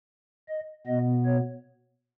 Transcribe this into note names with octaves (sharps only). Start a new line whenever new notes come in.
D#5
B2 B3 D#5
C#5